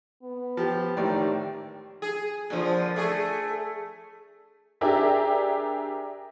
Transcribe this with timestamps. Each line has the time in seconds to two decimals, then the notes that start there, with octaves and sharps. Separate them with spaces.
0.23 B3
0.57 F3 G4
0.97 A1 D#3 G4 D5
2.02 G#4
2.50 A#2 D3 F3
2.96 A3 G#4
4.81 D4 G4 G#4 A#4 D5 E5